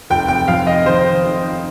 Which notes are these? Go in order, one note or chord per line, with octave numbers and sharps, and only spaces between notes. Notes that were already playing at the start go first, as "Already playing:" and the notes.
F1 G5
G5
F2 F5
D#5
D#3 C5
F1